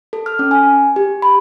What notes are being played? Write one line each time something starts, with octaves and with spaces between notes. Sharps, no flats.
A4
F6
C#4
G#5
G4
B5